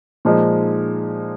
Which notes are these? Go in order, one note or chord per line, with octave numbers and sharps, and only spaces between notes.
A#2 F3 G#3 D#4